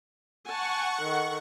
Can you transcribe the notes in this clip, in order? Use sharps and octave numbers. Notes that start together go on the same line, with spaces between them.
F#5 G#5 A5 C#6
D#3 A4